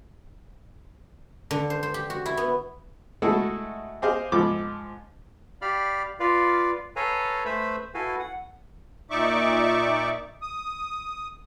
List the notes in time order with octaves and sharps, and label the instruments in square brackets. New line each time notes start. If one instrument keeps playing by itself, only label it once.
[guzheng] D3
C5
C5
G4
F#4
E4
B3
[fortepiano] G#3 A3 E4 F#4 G#4 A4
G4 G#4 C5 D#5 F5
G#2 F3 A4 B5 D6
[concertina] G4 D5 F5 B5 F6
F4 B4 D5 F5
A4 B4 C#5 F5 G#5 A#5
A3 B4 C5 E5 B5 E6
E4 F#4 A4 B4 F5 G#5
F#5
[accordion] A#2 D#4 D5 E5 C#6 D6
D#6